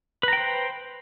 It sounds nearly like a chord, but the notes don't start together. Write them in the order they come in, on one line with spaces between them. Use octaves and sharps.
B4 A#5 G5 C5